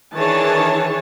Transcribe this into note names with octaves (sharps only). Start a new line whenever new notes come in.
D#3 E3 D4 G#4 C#5 A5